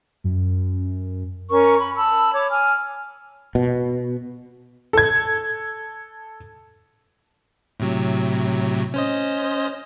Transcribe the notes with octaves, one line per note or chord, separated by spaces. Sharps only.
F#2
C#4 A#4 C#6
B5
A5 B5 E6
C#5 D6
G#5 F6
B2
A4 G#6
A2 C3 F#3
C#4 C5 D#5